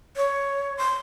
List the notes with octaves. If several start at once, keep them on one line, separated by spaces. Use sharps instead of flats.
C#5
C6